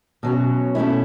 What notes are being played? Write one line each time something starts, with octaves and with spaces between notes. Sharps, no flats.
B2 F#3 C#4
B2 A3 C#4 E4